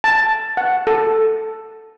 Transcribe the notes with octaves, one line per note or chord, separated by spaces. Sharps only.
A5
F#5
A4